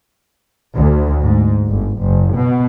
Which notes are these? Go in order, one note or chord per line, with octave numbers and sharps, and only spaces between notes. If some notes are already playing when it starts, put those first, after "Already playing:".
D2
G#2
G1
F#1
B2